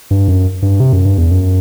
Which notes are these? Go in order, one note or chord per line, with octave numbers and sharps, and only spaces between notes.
G2
F#2
G2
C3
F#2
G2
E2
F#2